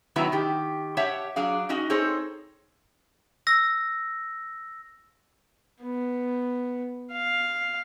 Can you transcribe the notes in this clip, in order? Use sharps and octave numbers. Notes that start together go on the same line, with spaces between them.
D#3 F#3 B3 E4 A#5
D#3 G4
G4 C#5 E5 F#5 A5
F#3 D4 G#4 F5
C#4 D#4 F#4 D#5
C4 D#4 G#4 A4 C5 C#5
E6 A#6
B3
F5